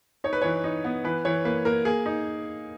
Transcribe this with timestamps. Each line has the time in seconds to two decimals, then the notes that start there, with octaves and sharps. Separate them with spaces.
0.24 D#4 C#5
0.33 B4
0.42 E3 C#5
0.64 D#4
0.84 B3
1.04 E3 B4
1.25 E3 C#5
1.45 A#3 B4
1.65 A#3 A#4
1.85 A#3 G#4
2.06 D#4